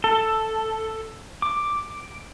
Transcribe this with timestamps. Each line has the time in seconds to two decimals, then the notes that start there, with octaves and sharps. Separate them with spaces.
0.04 A4
1.42 D6